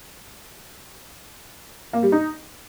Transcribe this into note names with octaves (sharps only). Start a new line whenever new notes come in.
A#3
G3
D#4